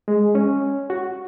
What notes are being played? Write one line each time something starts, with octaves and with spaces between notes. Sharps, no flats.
G#3
C#4
F#4